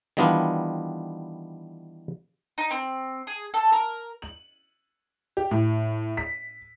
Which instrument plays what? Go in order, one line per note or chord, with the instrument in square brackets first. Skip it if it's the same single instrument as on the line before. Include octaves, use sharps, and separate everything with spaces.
[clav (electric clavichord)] D#3 E3 G3 B3 D4 F4
[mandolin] D#4
C4
G#4
A4
A#4
[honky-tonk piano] F#7
G4
A2
B6